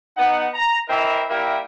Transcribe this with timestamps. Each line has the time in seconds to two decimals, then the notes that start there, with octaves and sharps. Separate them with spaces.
0.18 B3 D#4 F#5
0.54 A#5
0.89 E3 C4 E4 A#4 D#5 E5
1.30 G3 A#3 E4 A#4 E5 G5